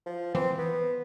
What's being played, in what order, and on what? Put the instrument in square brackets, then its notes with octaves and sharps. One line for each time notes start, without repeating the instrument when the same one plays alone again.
[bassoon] F3
[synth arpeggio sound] E3 [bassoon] C4
[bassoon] B3